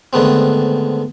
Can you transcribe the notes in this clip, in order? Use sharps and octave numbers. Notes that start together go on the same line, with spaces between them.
G#2 D3 D#3 A3 B3 C4